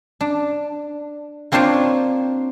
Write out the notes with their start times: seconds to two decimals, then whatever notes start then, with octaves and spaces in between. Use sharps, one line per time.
0.21 D4
1.52 A#3 C4 D4 F4 C5 C#5